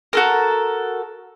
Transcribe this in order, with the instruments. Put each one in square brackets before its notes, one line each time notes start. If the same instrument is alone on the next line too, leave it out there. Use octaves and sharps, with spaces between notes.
[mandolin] F#4 A4 A#4